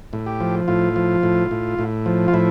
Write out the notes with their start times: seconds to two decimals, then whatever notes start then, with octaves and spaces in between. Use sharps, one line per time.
0.13 A2
0.26 G4
0.40 F3
0.68 A2 F4
0.96 F3
1.23 A2
1.51 A2
1.79 A2
2.06 F3
2.28 F4
2.33 A2 E4